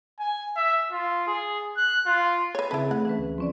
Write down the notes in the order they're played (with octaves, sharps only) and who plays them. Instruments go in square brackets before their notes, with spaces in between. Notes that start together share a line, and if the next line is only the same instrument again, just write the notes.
[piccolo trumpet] G#5
E5
F4
G#4
F#6
F4
[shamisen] B4 C#5
[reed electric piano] C#3 A5 B5 [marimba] C4 G#4 [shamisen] E4 B4
[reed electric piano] A3 [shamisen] F#5
[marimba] E3 C#4 B4
[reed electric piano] D2
[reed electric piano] F3 [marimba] C4 C#4 D5